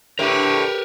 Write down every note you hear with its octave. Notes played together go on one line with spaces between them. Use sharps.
A2 D3 G4 A#4 B4